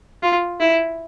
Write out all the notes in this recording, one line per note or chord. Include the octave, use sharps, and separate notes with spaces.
F4
E4